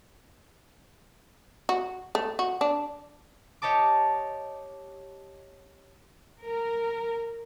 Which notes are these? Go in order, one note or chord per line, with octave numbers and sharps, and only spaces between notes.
F#4
A3
F#4
D4
G4 C#5 D#5 A5 D6
A#4